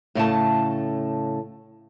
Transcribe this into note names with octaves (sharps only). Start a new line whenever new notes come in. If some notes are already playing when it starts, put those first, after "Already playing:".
A2 C#3 A3 A5